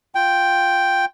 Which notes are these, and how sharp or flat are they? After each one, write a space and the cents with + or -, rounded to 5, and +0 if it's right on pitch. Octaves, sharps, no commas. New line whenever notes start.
F4 +5 G5 +0